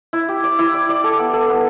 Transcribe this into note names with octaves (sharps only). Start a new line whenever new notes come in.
E4
G4
D5
E4
D5
D5
A4
B3
A4
B3